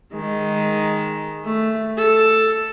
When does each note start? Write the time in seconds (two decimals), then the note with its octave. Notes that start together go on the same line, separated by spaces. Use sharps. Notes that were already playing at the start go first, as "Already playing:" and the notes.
0.13 D#3 G#3
1.45 A3
1.97 A4